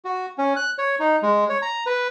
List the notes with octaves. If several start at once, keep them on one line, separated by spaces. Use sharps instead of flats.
F#4
C#4
F#6
C#5
D#4
G#3
C#5
A#5
B4